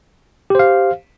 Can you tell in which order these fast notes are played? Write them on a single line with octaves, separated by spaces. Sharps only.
G4 C5 F5